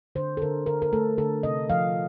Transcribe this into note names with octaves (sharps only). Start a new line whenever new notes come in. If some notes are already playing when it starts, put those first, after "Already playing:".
D3 C5
A4
D3 A#4
D3 A#4
A#4
A3 A4
D3 A4
C3 D#5
F3 F5